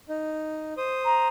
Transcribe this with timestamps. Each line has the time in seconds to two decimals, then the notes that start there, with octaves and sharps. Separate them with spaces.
0.09 D#4
0.77 C5 D#6
1.05 A#5